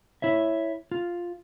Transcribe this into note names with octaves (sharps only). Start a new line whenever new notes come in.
E4 C#5 E5
F4